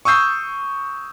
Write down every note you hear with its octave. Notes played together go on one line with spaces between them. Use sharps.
C#6 D#6 E6 G6 C7